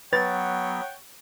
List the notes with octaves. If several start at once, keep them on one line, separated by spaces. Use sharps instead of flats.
F#3 B3 B4 C#5 F#5 G5 A6